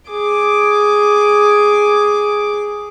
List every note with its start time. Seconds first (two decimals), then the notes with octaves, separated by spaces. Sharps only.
0.10 G#4 D6